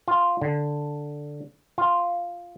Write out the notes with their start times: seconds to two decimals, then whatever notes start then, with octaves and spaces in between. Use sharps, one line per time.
0.08 F4
0.42 D3
1.78 F4